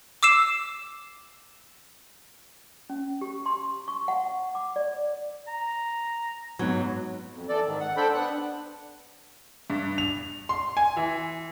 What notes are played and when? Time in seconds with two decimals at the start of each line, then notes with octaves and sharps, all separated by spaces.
0.23 D6 E6 C7 E7
2.90 C#4
3.21 G4
3.46 C6
3.88 C#6
4.08 F#5
4.55 D6
4.76 D5
5.48 A#5
6.59 G#2 F#3 B3
7.34 F2
7.49 E3 A4 D5
7.66 G#2 D#3
7.80 F#5
7.97 D4 A4 C5 G5 B5
8.14 B3 D4 F#5 F#6
9.70 G2
9.98 F7
10.49 C6
10.77 G#5
10.97 E3